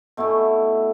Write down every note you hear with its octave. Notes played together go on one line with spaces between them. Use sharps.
B2 A3 E4